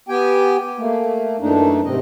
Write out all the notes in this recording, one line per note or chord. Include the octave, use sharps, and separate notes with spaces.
B3 G4 G5 G#5
A3 A#3
F#2 D#3 E3 A3 D4 D#4
G#2 C3 C4 D#5